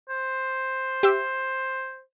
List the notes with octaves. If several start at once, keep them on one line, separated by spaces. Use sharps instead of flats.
C5
G4 E5 E6